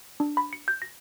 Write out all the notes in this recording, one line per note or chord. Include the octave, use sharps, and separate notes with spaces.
D4
B5
C#7
G6
A#6